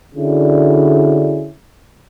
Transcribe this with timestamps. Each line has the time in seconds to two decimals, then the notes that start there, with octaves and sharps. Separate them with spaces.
0.15 D3 C#4 D4 E4 F#4 G#4